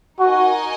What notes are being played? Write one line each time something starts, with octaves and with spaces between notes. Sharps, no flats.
D#4 F#4 A#4 D#5 G#5